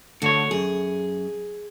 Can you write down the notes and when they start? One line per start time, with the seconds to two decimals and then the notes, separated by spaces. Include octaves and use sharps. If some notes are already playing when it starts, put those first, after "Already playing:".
0.22 D2 D3 F#4 C#5
0.51 F#2 G#4